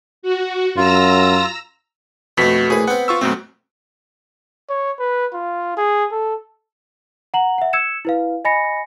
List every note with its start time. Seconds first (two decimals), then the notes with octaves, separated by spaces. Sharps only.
0.23 F#4
0.77 F#2 F4 A#5 E6 A#6
2.38 F2 B2 A3 B6
2.70 A#1 A2 G#4 B4
2.88 B3 C4 F#5
3.08 F4 C#6 E6
3.21 F#2 B2 A3 C4
4.70 C#5
4.99 B4
5.34 F4
5.77 G#4
6.12 A4
7.34 F#5 A#5 F#7
7.58 E5 F#5
7.73 E6 G#6 C#7 E7
8.05 E4 B4 F5
8.45 D#5 G#5 B5 A#6 C#7